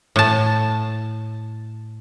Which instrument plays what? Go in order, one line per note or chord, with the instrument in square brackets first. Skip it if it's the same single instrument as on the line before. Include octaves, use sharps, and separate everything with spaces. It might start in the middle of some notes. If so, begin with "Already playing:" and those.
[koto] A2 A5